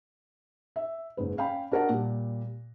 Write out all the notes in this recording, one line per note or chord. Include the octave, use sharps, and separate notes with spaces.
E5
F#1 G#2 B4
C#4 F5 G5 B5
D4 F#4 A#4 D#5 F#5 A5
A#2 G3